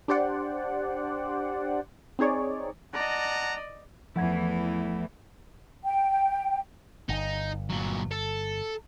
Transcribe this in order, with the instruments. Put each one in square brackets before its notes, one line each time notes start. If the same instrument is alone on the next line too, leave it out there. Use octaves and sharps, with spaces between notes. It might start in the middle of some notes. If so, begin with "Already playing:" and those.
[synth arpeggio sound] D4 G4 C5 D5 F#5
C4 D#4 G#4 C#5 D5
[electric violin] D5 D#5 [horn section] F#5 A5 A#5
[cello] E2 E3 [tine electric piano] F3 F#5 G#6 [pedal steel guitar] A3 E4
[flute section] G5
[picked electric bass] G1 [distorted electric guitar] D#4
[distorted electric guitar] A#2 F#3
A4